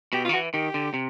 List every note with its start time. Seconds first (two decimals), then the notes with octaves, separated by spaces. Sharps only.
0.13 B2 G4
0.25 F4
0.29 D#3
0.33 E3 F#4
0.54 D#3 G4
0.74 D3
0.94 C3